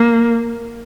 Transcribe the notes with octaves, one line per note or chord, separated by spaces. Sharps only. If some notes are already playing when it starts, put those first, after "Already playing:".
Already playing: A#3